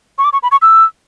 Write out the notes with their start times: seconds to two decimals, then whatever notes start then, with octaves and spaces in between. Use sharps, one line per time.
0.18 C#6
0.24 D6
0.33 C#6
0.43 B5
0.52 C#6
0.62 E6